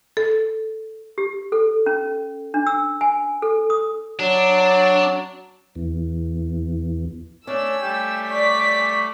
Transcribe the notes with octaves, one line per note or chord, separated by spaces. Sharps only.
A4
G4
A4
C#4
D4
E6
G#5
A4
D#6
F#3 D4
E2
A3 C#4 D4 E6
G3 A3 G5
D5 C#6 B6